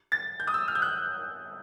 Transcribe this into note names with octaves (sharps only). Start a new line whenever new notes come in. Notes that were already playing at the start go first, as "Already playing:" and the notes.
A6
G6
D#6
E6
F6
G6
F#6